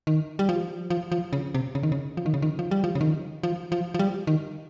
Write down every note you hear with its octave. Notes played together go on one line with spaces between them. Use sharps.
D#3
G3
F3
F3
F3
C#3
C3
C#3
D#3
C#3
F3
D#3
C#3
D#3
F3
G3
F3
C#3
D#3
F3
F3
F3
G3
D#3